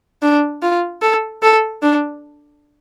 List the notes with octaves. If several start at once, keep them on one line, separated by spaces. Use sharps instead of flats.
D4
F4
A4
A4
D4